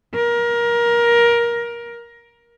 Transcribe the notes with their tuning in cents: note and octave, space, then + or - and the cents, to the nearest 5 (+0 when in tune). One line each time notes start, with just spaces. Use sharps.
A#4 +20